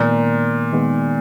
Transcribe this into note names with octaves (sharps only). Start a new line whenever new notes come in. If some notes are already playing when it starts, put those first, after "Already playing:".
Already playing: A#2 D#3 G#3 B3
D#3 G#3 B3